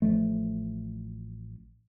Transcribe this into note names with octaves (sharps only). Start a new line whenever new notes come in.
A1 F3 A3